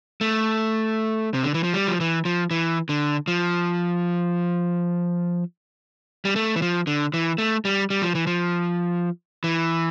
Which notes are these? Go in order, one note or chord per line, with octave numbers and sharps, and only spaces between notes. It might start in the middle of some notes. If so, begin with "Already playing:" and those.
A3
C3
D3
E3
F3
G3
F3
E3
F3
E3
D3
F3
G3
A3
E3
F3
D3
E3
A3
G3
G3
F3
E3
F3
E3